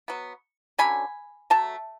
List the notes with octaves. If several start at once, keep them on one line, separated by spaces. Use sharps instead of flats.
F#3 B3
D3 F#3 C#4 G#5 B5
F#3 A3 A5